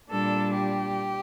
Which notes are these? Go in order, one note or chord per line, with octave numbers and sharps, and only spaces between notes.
A#2 G3 D4 A4
G4